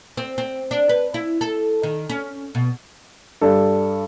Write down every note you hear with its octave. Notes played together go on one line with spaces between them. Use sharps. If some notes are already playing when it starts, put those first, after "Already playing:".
C4
C4
D4
B4
E4
A4
D#3
C#4
B2
G2 D4 A4